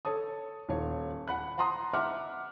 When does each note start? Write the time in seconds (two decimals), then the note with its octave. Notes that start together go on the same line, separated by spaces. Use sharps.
0.05 A4 C#5 A5 D#6
0.69 D#1 C#5
1.28 F#5 B5 F#6
1.58 F#5 A5 A#5 C6 D#6
1.93 E5 F#5 D6 F6